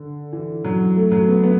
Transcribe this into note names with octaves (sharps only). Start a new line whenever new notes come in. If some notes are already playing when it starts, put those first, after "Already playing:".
Already playing: D3
E3
F#3
A3
F#3
B3
B3